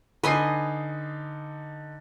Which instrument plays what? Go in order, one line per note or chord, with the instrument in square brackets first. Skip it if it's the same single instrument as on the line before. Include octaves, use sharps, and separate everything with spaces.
[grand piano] D3 D#4 C7 [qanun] B4 D#5 G#5